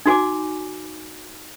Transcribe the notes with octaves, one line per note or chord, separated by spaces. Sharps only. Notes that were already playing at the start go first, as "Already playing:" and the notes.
D#4 F#4 G#5 D6